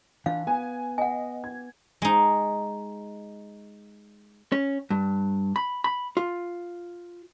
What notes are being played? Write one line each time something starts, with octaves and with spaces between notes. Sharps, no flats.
E3 D4 F4 F5
B3 G#5
D#5 F#5 G#5
G#6
G#3 D#4
C#4
G2
B5
B5
F4